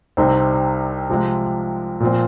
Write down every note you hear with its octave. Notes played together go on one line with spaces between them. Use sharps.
C2 C3 G3 C4 D#4
C3 F3 G#3
A#2 F3 C4